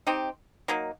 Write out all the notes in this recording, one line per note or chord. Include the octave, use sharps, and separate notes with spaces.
C4 D#4 G4
F#3 A#3 D#4